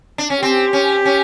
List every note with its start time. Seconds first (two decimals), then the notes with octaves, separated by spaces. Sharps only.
0.18 D4
0.30 C#4
0.42 C4 G4
0.73 C#4
1.05 C#4